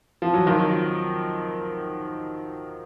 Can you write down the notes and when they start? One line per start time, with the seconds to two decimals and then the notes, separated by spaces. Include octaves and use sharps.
0.22 F3
0.34 F#3
0.46 D#3 F3